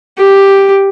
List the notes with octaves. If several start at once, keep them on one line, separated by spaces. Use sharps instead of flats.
G4